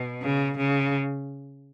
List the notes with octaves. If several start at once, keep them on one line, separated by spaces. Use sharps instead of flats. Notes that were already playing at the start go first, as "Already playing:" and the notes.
Already playing: B2
C#3
C#3